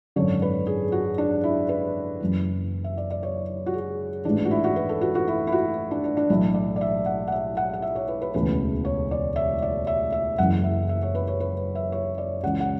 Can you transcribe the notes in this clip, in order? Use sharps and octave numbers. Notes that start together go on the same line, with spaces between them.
G#1 F#2 D3 C#5
B4
G#4
F#4
D4
E4
B4
F#1 F#2 E3
E5
D5
D5
C#5
F#4
G#4
A1 G#2 E3 D4
F#4
E4
F#4
B4
A4
F#4
F#4
E4
E4
F#4
D4
D4
D4
B1 A2 E3 E4
D5
D5
E5
F#5
F#5
E5
F#5
F#5
E5
C#5
B4
B4
E1 D2 C#3 E3 B4
C#5
D5
E5
D5
E5
E5
F#1 F#2 E3 F#5
E5
E5
C#5
B4
C#5
B4
E5
C#5
D5
C#2 C#3 E3 F#5
F#5